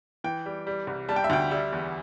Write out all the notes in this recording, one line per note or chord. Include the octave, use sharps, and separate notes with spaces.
E3 G5
G3
G3
C2
G3 A5
G5
E5
D2 G5
G3 E5
E2